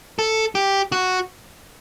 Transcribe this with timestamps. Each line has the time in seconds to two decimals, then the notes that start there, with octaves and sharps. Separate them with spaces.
0.19 A4
0.55 G4
0.92 F#4